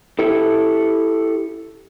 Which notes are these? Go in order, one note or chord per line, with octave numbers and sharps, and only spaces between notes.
E4 G4 A4